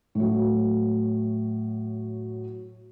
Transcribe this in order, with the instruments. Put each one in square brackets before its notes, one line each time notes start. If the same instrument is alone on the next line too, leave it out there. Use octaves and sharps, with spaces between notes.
[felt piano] A2 F#3